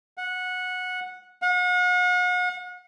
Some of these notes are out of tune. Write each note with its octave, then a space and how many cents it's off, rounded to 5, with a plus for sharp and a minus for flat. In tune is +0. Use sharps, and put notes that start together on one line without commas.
F#5 -15
F#5 -40